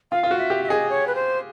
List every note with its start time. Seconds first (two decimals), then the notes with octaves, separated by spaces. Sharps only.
0.11 F4 F5
0.23 F4
0.31 F#4
0.38 E5
0.50 G4
0.64 E5
0.68 G#4 D#5
0.90 C#5
1.07 B4
1.15 C5